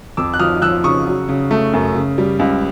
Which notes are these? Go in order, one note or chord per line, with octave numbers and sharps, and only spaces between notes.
F2 D6 E6
F#6
F3 D#6 F6
F3 E6 F#6
C#3 C#6 D#6
F#3
C#3
A3
F#2
C#3
G3
C#2